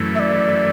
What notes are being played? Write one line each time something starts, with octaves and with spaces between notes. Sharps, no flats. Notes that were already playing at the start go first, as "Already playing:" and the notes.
Already playing: F#2 E3 A3
E5
D5